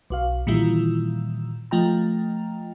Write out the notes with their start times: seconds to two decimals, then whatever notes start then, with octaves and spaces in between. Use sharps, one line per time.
0.10 B1 F#4 F5
0.47 A#2 D#3 E3 G3 E4 F4
1.71 F3 A3 F4 D#5 G5 A#5